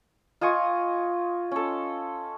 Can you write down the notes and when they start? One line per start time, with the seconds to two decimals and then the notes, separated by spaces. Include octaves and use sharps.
0.41 F4 D#5 G#5 C#6
1.52 C#4 A4